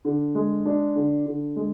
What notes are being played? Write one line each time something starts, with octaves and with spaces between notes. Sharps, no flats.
D3
G#3
D4
D3
D3
G#3